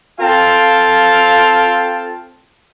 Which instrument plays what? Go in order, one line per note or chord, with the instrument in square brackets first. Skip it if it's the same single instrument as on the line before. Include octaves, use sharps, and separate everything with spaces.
[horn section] C4 F4 A4 F5 G5 A5